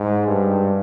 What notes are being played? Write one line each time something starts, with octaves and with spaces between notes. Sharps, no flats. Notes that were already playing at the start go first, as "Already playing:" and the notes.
Already playing: G#2
G2